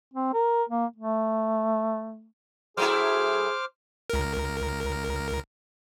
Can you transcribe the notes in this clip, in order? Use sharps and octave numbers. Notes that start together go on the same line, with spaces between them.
C4
A#4
A#3
A3
F#3 A3 E4 G#4 C5 D6 F6
C#2 A#4